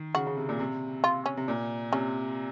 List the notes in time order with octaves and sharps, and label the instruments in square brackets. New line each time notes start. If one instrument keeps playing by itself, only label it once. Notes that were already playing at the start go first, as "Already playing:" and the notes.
Already playing: [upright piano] D#3
[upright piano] C#3 [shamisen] F#4
[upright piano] C#3
C3
A#2
C3
[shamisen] F4
C#4
[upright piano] C3
A#2
[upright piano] C3 [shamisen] C#4